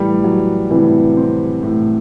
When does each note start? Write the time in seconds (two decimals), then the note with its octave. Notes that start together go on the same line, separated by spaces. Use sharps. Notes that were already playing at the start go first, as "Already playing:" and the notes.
Already playing: A2 E3 G3
0.24 F#3
0.71 A2 C3 E3
1.17 C4
1.63 A2